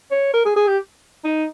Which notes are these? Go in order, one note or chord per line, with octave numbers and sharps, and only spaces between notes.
C#5
A#4
G#4
G#4
G4
D#4